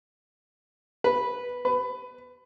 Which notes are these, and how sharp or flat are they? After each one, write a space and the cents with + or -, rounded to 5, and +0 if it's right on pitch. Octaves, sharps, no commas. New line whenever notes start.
B4 -5
B4 +20